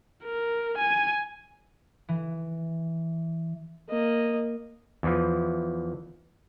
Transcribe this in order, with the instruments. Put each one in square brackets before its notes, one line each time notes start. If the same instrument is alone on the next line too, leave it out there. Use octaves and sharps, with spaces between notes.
[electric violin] A#4
G#5
[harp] E3
[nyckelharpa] A#3 D#5
[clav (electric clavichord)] E2 E3 F3